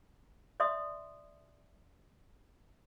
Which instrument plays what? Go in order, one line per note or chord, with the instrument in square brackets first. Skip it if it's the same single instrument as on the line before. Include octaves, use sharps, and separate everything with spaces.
[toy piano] D5 E5 C6 D#6